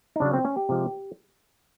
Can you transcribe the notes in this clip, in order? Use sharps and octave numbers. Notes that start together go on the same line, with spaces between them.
D#4
C#3 F#3 D4
C4
C#4
G4
C3 F3 G#3